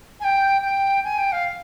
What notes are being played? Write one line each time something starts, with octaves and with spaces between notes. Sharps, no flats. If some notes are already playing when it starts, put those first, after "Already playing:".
G#5
G5
G5
G#5
G5
F5